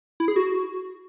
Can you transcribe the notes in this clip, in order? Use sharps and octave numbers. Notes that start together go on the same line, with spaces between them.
E4
G#4
F#4